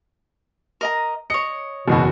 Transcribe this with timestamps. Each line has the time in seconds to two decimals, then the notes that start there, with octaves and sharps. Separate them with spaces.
0.81 A#4 D#5 A#5
1.30 C#5 D#5 C#7
1.88 F#1 E2 B2 F#4